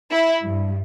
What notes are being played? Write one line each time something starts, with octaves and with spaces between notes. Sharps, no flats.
E4
G2